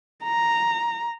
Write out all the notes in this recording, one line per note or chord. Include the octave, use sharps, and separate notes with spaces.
A#5